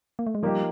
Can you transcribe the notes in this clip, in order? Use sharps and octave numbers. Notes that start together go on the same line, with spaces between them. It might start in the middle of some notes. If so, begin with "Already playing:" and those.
A#3
A3
G#3
F3 G3 A#3 D#4 G4